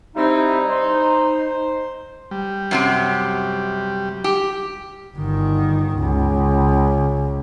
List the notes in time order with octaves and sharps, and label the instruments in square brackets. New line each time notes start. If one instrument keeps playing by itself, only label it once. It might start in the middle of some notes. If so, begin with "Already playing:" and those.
[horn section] G3 C4 E4 [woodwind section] D#4
[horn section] C5
[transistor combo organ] G3
[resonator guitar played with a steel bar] F#2 C3 G4
G4
[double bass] G1 D#3
C#2